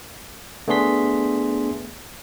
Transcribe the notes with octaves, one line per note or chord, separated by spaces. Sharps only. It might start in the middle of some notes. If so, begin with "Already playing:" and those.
A3 B3 D4 G#4 C6 B6